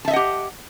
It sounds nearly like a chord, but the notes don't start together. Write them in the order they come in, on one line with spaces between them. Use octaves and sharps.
A5 E5 D#5 F#5 G4